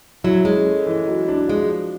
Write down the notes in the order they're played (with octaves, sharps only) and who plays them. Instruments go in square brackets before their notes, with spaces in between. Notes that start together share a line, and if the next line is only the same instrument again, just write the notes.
[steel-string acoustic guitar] F#3 [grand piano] E4
[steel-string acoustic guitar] G#3 [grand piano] C#4
[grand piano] A3
E3
F#3
D4
[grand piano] F3 [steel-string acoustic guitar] G#3